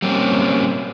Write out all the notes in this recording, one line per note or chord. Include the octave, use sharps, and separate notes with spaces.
G3 A#3 C4 C#4